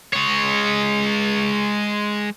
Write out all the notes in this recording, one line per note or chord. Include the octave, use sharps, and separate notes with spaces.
G#3 C#5